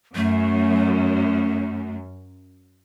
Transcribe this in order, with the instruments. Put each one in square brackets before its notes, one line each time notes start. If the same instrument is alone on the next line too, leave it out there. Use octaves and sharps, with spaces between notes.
[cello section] F#2 [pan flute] A3